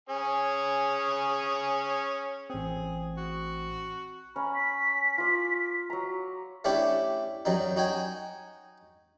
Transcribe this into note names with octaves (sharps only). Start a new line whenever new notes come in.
C#4 G#4
A1 C4 G#4
F#4
C#4 A#5 B5
B6
F4 D5
F#3 A#5
A3 C#4 D4 E4 G4
F#2 F#3 G3 D#4
D#4 F#4 G5 G#5